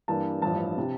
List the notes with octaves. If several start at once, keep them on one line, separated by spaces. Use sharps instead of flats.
G2 E3 A#3 D4 A5
A1 G2 F3 A5
C3